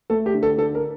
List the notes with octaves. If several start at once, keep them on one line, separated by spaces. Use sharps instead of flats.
A3 A4
G4
D3
A4
D3 A4
A#4